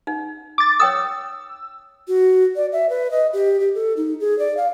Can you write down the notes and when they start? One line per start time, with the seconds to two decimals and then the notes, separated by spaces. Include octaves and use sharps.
0.07 D#4
0.58 D6 A6
0.80 C#5 G5 D#6 E6
2.08 F#4
2.56 D5
2.72 E5
2.90 B4
3.11 D#5
3.33 G4
3.60 G4
3.75 A4
3.97 D#4
4.20 G#4
4.39 D5
4.57 F5